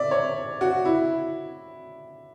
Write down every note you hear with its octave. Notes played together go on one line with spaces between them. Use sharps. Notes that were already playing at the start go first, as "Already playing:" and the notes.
Already playing: D5 E5
C#5
F#4
E4